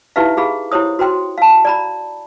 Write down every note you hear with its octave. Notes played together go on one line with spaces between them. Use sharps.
D#4 E4 G4 B4 E5 F5
G4 G#4 F5 B5
E4 G4 C5 C#5 D#6
F#4 C5 G5 C6
F5 A5
D5 A#5 B5